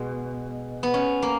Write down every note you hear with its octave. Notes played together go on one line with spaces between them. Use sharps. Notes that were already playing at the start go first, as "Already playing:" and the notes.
Already playing: B2 G#3
B3
C#4
A#3